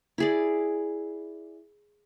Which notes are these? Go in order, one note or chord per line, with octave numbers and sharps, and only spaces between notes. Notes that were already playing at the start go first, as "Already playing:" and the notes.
E4 G#4 D5